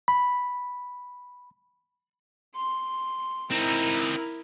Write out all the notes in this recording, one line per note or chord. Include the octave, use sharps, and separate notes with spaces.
B5
C6
C4 D#4 E4 A#4